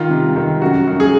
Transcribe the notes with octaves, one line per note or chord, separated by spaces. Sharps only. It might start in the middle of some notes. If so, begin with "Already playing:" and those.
Already playing: D#3 F4
C3
D#3
F#2 F#4
F#2
G#4